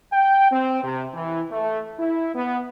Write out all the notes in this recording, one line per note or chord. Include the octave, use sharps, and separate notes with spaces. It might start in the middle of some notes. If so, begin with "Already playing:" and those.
G5
C4
C3
E3
A3
E4
B3